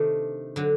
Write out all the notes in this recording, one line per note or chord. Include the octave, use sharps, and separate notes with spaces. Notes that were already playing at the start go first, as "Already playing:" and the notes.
Already playing: C3 D#3 A3 D4
D3 F#3